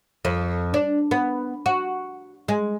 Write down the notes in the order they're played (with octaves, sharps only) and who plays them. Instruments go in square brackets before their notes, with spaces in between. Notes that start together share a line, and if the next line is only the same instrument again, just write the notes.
[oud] F2
D4
B3
F#4
G#3